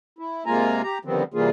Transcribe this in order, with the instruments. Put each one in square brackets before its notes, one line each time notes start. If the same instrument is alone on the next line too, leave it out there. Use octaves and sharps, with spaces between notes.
[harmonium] E4
C3 G#3 A#3 F4 G#5 A#5
G4 A#5
D3 D#3 F3 G3 B3 C4
C3 E3 G3 A#3 F4 G#4